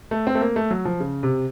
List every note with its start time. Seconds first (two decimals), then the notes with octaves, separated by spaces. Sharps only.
0.11 A3
0.27 C4
0.35 A3
0.41 A#3
0.56 A3
0.71 F#3
0.85 F3
1.00 C#3
1.23 C3